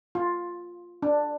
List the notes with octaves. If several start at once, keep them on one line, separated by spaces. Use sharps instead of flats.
F4
D4